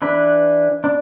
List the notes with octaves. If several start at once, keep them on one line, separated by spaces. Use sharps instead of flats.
E3 D4 B4
D4